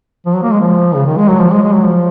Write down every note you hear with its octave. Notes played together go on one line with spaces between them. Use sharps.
F3
F#3
A#3
G#3
F3
C#3
D#3
G#3
F#3
F3
G#3
G#3
F#3
F3